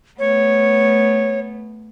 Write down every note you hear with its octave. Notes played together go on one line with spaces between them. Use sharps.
A3 B3 C#5